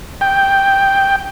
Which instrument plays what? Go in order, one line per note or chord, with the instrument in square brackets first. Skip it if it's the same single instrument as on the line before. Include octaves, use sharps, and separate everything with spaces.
[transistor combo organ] G5